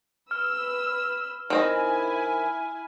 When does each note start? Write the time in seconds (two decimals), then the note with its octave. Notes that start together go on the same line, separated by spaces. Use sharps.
0.31 B4 E6 F6
1.50 D#3 C4 E4 D#5 G#5